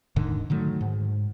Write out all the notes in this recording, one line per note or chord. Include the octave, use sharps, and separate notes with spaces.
D#1 G#2 D3 D#3
D3 D#3 F#3 A3
G#2